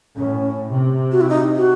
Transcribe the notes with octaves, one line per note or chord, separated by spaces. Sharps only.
A2 C#4
C3
F#4
E4
D#4
F#4